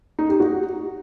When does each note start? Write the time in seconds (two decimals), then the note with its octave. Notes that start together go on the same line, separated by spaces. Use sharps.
0.19 D#4
0.29 G4
0.40 F#4